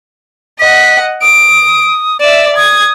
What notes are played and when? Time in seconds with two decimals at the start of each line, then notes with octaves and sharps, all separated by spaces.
0.59 D#5 F#5 B6
1.22 D#6 D7
2.20 D5 E5 E7
2.56 D#6 G#6